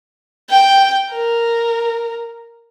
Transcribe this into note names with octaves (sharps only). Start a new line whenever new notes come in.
G5
A#4